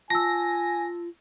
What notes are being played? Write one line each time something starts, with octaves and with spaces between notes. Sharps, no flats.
F4 G#5 A5 E6 A#6